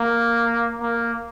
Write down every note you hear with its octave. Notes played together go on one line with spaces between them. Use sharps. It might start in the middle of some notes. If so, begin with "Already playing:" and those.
Already playing: A#3
A#3